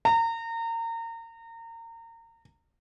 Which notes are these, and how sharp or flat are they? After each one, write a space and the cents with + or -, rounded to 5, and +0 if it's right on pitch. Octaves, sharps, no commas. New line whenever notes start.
A#5 -30